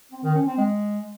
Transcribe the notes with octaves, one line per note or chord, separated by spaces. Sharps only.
C4
D#3
C#4
C4
G#3